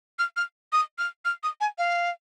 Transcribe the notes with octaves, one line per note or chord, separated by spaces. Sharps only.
F6
F6
D#6
F6
F6
D#6
G#5
F5